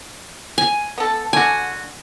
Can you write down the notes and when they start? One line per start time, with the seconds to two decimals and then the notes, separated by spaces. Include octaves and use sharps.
0.58 G#5
0.98 B3 A4
1.33 D3 F#4 G#5